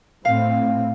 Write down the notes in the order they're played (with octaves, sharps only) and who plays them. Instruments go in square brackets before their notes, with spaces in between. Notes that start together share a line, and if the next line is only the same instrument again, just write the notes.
[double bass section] A2 C4 [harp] F5